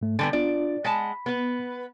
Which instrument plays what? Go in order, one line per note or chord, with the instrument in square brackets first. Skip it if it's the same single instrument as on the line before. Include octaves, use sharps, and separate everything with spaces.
[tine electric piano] G#2 A3
[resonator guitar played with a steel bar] D3 G3 B3 [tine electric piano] G#5 A5
[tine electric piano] D4 F4 [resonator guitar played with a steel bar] D5
[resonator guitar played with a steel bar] G#3 F#5 A5 [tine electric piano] B5 B6
[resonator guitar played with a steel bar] B3 B4